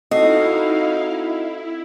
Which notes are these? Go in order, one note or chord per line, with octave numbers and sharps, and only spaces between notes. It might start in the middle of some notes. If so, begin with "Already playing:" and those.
C4 D#4 E4 F#4 A4 D#5 F5 C7
E4